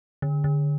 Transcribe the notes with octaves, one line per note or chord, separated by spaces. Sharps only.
D3
D3